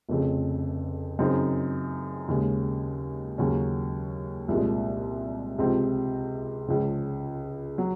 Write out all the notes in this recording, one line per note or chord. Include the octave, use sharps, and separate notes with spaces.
F1 F2 C#3
F#2 C#3 F#3 C4 D#4
D#2 C#3 G#3
D#2 C#3 F#3 C#4
C2 A#2 F3 G#3
C#2 C3 F3 C4
C#2 C#3 F3
F#3